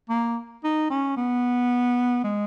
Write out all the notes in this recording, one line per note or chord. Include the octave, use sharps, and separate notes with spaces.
A#3
D#4
C#4
B3
G#3